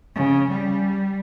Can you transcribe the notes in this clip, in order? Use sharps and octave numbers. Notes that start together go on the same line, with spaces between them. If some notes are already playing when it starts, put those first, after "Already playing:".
C#3
G3